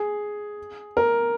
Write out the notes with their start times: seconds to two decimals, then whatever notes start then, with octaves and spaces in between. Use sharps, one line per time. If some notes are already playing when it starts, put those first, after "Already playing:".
Already playing: G#4
0.97 A#4